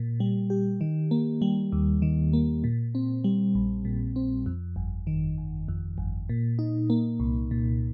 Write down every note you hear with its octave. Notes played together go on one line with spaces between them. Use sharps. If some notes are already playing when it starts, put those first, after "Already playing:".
Already playing: A#2
G3
G4
D#3
A#3
G3
D#2
D#3
A#3
A#2
C4
G3
A#1
A#2
C4
F2
G1
D#3
G1
F2
G1
A#2
D#4
A#3
C2
A#2